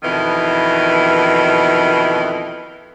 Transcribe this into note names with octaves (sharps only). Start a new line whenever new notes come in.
F2 B2 D#3 E3